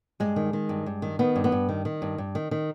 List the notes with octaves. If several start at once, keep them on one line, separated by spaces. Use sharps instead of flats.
G2 G#3
D#3
D#3
G2
G2
D#3
D#3 B3
G2
B3
G2
D#3
D#3
G2
G2
D#3
D#3